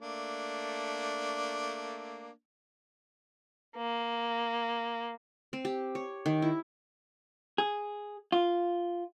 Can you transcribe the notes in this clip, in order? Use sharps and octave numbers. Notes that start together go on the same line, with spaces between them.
A3 A#3 D4
A#3
C4
G4
C#5
D#3
E4
G#4
F4